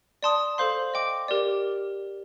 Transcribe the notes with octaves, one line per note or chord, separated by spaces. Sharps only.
D5 A5 C6 D#6
A4 C5 F5 C6
D#5 G5 D6
G4 A#4 D5